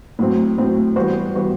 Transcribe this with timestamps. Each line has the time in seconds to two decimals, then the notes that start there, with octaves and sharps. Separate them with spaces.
0.19 A2 F#3 C4
0.58 A2 F#3 C4
0.96 E3 G3 B3 F#4 C5
1.34 E3 G3 B3 F#4 C5